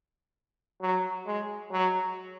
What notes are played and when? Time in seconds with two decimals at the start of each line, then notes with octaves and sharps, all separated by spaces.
0.81 F#3
1.26 G#3
1.72 F#3